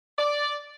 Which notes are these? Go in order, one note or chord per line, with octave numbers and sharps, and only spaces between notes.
D5